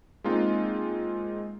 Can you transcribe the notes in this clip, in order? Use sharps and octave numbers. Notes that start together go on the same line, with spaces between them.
G#3 A#3 C4 D#4 F4